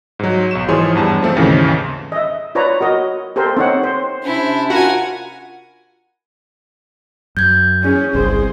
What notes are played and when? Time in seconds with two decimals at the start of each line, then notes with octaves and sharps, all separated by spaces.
0.19 G#2 F#3
0.51 B1 C#6 E7
0.69 G#2 E3 F3 G#4 C#5 C6
0.96 E2 G2 A5
1.22 F3 A3 C4
1.37 D#2 G#2 C#3 E3
2.12 D#5 E5
2.55 F4 B4 C#5 D5 A#5
2.81 F#4 A#4 D#5
3.36 G4 A4 A#4 C5
3.57 C4 D#4 C#5 F#5
3.84 C5
4.24 C3 C#4 D4 E4 C5
4.70 F4 F#4 A#4 F#5 G#5
7.37 F#2 G6 G#6
7.83 C#4 G#4
8.15 G1 C2 C4 G#4 C5